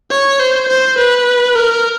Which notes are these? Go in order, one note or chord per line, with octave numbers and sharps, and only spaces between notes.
C#5
C5
C5
B4
A#4